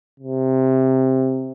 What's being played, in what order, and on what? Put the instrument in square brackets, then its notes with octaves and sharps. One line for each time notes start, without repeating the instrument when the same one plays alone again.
[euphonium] C3